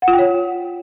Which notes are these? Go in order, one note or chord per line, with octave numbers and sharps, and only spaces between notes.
F#5
F4
G5
C#5